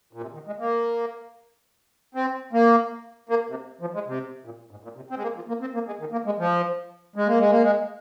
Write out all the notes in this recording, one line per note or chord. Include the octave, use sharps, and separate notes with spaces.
A#2
C3
D#3
G#3
A#3
C4
A#3
A#3
C3
F3
G#3
C3
A#2
G#2
A#2
C3
C4
G#3
A#3
F3
A#3
C4
A#3
G#3
D#3
A#3
G#3
F3
G#3
A#3
G#3
A#3
G#3